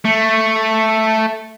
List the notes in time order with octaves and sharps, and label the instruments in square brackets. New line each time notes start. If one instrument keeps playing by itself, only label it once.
[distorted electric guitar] A3